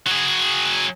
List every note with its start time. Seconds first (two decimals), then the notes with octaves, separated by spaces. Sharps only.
0.07 F#3 G#4